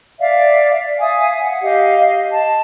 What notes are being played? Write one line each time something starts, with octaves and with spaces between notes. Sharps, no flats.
D5 E5 F5
E5 F5 G#5 D#6
F#5
G4 D#5 F5
D#5 A5